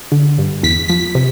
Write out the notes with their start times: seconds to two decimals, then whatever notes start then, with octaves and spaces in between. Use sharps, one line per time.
0.12 D3
0.38 G2
0.63 E2 B6
0.88 F3 B6
1.15 C3